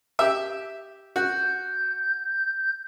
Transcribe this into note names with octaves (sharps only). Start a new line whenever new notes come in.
G4 E5
F#4 G6